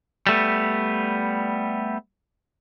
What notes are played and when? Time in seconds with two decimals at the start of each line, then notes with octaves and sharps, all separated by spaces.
0.27 G3 A3 B3